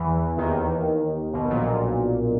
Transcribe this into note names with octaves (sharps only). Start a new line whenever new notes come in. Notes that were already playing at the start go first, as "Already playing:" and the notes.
Already playing: E2 E3
D#2 D#3
B1 B2
A#1 A#2